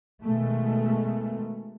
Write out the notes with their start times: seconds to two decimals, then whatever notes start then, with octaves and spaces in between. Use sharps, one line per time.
0.23 B2 D#3 G#3 A3